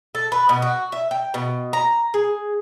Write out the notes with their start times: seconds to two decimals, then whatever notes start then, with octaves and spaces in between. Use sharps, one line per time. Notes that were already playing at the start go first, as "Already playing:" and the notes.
0.15 A4
0.32 B4
0.49 B2
0.62 F#4
0.92 E5
1.11 G5
1.34 B2
1.73 A#5
2.14 G#4